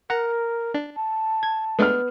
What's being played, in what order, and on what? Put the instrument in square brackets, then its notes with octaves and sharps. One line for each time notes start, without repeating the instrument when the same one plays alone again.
[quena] A#4 [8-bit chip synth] F#5 A#5
[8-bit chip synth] D4
[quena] A5
[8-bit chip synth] G#6
[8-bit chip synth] G#3 A3 D4 [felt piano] B3 F6